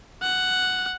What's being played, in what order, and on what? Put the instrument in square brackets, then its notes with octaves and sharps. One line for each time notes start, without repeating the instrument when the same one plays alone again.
[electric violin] F#5